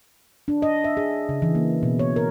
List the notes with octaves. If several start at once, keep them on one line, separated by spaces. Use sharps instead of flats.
D4
D#5
E5
G#4
C#3
E3
A#3
B2
C#5
A#4